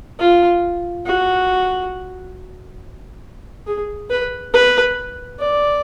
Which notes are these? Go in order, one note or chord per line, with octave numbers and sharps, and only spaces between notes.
F4
F#4
G#4
B4
B4
D5